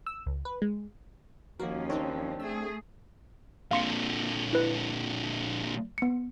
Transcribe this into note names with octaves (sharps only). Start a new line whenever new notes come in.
E6
C#2
B4
G#3
D#2 F3 A#3 C#4 F#4 A#4
C4 D4 D#4 A#4 C#5
A3 G#4 E6
A#2 D3 F5 C6 C#7
E4 B4
B3 C#7